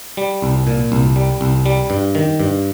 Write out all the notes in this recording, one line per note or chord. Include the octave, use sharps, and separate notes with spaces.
G3
C2
A#2
C2
G3
C2
G3
G2
D#3
G2